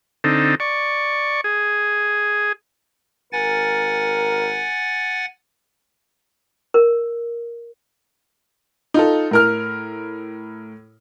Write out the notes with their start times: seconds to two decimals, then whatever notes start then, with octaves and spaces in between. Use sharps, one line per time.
0.24 D3 C4 D#4 A4
0.60 D5 C#6
1.44 G#4
3.32 G#1 A#4 F#5 G#5 A6
6.74 A#4
8.94 D#4 F4 A4
9.31 A2 A#4 F6